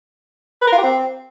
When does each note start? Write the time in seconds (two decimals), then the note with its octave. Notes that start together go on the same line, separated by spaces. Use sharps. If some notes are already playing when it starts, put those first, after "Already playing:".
0.62 B4
0.67 A#4
0.73 F4
0.78 G4
0.83 C4